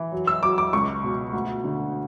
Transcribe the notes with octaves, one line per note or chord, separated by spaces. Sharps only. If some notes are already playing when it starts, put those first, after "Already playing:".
Already playing: E3
F#3
E6
F#3 D6
D6
C#2 C#6
B2
D2
D3